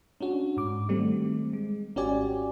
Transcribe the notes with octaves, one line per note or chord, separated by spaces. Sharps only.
C#4 D4 F#4
G#2 D6
D#3 G3 A3 C4
G#3
G#1 C#4 F#4 G4 D5 G#5